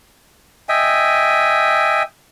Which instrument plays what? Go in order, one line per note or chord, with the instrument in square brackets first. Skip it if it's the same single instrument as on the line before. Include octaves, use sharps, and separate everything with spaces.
[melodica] D#5 E5 G5 G#5